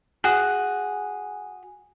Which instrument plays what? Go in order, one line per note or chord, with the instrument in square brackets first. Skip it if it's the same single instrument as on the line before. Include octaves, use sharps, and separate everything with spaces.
[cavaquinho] F#4 G#4